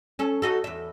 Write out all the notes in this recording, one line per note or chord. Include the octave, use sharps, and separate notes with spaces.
C#4 A4
D#4 F#4 A4
E2 E5